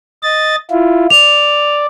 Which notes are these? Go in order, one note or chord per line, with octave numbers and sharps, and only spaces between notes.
D#5 A6
E4 F4
D5 F7